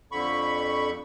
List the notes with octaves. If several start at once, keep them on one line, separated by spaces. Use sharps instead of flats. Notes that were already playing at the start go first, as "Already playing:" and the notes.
F2 D3 B5 C#6